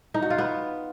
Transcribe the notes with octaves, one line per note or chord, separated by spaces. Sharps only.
D#4
F#4
F4
B3